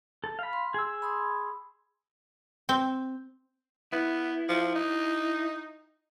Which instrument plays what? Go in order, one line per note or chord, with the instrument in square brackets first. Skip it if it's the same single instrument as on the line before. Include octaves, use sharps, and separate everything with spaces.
[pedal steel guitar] A4
F5 B5
[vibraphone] C6
[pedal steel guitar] G#4 E6
[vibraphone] B5 C6 D#6
[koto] C4
[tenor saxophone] B3 [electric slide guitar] E4
[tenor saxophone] F3
D#4